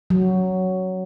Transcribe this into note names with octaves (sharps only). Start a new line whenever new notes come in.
F#3